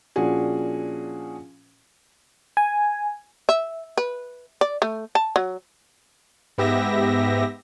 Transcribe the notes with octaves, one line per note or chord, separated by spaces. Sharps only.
A#2 F3 C#4 D4 F#4 G#4
G#5
E5
B4
D5
A3
A5
F#3
G#2 B3 G4 E5 A#6